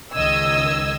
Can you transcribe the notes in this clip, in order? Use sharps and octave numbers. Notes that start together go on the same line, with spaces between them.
C#2 D#3 D#5 E6 G#6